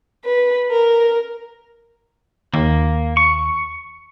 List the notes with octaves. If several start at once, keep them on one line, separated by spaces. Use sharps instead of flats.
B4
A#4
D#2 A#3
C#6